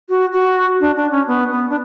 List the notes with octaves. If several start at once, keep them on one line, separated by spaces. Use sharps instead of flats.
F#4
F#4
D4
D4
C#4
B3
B3
D4